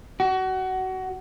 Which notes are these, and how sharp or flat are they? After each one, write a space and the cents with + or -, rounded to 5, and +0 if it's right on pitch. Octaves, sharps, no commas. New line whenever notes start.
F#4 +25